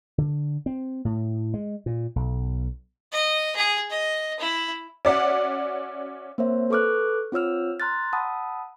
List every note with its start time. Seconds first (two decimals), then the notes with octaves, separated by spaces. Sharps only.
0.18 D3
0.66 C4
1.05 A2
1.54 G#3
1.86 A#2
2.16 B1
3.12 D#5
3.56 G#4
3.90 D#5
4.40 E4
5.05 C#4 F#4 D5 E5 F#5
6.38 A#3 C4 A#4 C5 C#5 E5
6.70 A4 B4 C#6 D6 F6 F#6
7.32 C4 F4 C#5 E6 F6
7.80 A#5 C6 F6 F#6 A6
8.13 F#5 A5 B5 D#6 E6